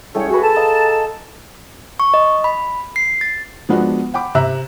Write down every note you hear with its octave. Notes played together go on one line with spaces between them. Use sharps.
C2 A3 C#4 G#4 C#5 G5
F#4 G#4 B4
A4 A5
D#5 F5 A#5
C#6
D#5
B5
C7
A6
F3 G#3 B3 D4 F#4
F#5 G5 B5 D6
C3 E5 A#5 E6 F#6